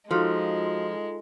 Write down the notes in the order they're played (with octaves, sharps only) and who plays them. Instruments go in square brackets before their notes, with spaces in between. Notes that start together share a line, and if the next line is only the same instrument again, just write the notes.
[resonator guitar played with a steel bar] F3 [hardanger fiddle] G#3 [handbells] D#4 F4 A4 [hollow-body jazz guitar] F#4 C#5